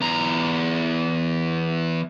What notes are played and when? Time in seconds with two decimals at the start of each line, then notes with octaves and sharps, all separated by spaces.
0.01 E2 A#5